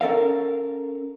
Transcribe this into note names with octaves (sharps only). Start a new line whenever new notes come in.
C#4 A4 A#4 F5